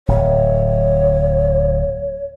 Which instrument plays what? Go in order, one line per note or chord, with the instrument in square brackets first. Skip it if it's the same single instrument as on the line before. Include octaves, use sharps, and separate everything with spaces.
[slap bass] D1 [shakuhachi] C#5